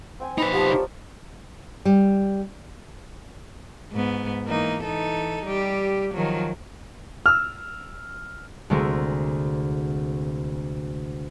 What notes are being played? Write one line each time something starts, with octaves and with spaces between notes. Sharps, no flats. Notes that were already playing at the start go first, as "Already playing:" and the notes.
C4 G5 G#5
D#4 B4 B5
F3 B3 G4 A5
A#4 C#5 D5
G3
G#2 B3
E3 A#3 D#4
E3 D#4 A4
G3 G4
D#3 F3 F#3
E6 F6
D2 C3 G#3 A3 A#4